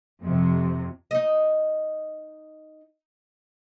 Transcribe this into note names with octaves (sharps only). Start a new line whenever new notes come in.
F2 C3
D#4 D#5